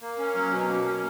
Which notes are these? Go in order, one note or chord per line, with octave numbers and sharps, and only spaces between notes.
A#3
C#4
F#3
B2
A#3
C#4